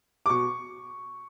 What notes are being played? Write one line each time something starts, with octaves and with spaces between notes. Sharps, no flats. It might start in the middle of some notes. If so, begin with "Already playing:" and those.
D6
B2 C#6